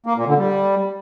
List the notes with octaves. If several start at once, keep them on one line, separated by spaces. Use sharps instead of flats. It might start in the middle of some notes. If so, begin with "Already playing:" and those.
A#3
A#2
D3
G3